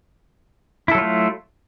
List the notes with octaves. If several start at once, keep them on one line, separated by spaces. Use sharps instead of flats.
F#3 A3 E4 F4 A4